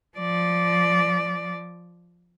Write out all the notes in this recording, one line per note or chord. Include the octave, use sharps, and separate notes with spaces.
F3 D5